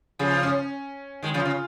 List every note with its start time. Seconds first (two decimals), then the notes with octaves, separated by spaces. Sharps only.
0.19 C#3 F3 G#4
0.32 F4
0.43 C#4
1.23 D#3 G#3
1.34 C#3 F3
1.40 F4
1.45 C#3